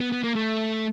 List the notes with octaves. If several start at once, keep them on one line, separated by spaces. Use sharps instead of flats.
B3
B3
A#3
A3